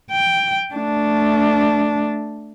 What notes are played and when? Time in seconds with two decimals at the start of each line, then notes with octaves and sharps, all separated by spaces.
0.11 G5
0.75 A3 D4